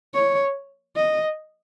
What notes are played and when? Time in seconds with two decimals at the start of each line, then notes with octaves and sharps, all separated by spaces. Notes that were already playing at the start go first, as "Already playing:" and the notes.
0.14 C#5
0.96 D#5